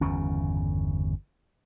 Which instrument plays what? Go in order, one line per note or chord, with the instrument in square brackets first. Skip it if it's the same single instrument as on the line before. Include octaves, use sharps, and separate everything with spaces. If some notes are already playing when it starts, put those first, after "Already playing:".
[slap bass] G1 E2 C#3 C#4